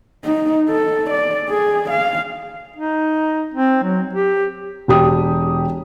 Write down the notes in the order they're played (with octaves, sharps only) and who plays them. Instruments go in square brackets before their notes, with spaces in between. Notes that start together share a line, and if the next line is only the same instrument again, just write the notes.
[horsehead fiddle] D#4
A4
D5
G#4
F5
[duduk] D#4
C4
F#3
G4
[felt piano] E1 G4 D#6